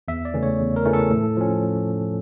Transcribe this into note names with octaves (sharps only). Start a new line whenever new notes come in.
E2 E5
D5
C#3 E3 A3 C#4
C#5
E2
A#4
C#3 E3 A3 C#4
A4
A2
F3 C#4